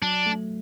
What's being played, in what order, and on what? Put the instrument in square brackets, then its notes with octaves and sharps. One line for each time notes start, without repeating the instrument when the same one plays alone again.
[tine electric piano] F#3 [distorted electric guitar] D4
[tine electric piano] A3